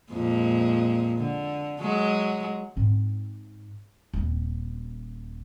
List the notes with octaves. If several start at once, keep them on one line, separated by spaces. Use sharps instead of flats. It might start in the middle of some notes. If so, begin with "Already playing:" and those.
F2 A#2 G#3
D3
F#3 G#3
G#2 C4
D#1 C4